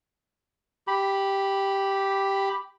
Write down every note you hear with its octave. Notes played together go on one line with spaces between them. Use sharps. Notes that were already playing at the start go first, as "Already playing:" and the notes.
G4 B5